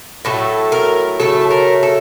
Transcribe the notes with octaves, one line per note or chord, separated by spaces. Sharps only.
A2 F#3 A3 A4
A#4
C#3 F#3 A3 A4
A#4
A4